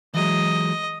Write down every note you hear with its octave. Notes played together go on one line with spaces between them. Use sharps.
E3 F#3 G#3 D#5